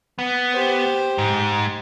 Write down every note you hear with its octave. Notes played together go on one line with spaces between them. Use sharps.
B3
G4 C5
G#2